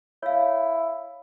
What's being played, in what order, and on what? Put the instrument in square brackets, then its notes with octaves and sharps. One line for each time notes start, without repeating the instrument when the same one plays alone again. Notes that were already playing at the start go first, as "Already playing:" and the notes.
[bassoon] E4 [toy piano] C#5 F5